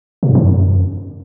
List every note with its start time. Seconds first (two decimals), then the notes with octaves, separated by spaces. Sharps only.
0.23 B2
0.29 G2
0.35 E3
0.41 F#2